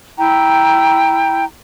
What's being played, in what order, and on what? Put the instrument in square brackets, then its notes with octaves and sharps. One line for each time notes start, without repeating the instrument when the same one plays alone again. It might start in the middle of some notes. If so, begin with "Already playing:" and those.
[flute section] E4 G5 A#5